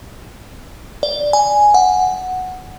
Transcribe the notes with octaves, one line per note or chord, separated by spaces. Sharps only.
D5
G#5
F#5